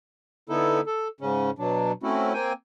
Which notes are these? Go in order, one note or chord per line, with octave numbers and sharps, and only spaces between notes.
D3 B3 D#4 E4 A4
A4
G#2 C#3 C#4
B2 F#3 D4
A3 C4 C#4 E4 F#4
A#3 C4 G5 G#5